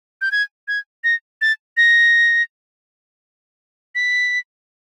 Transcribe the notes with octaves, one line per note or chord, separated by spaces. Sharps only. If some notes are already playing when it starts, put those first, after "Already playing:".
G6
G#6
G#6
A#6
A6
A#6
B6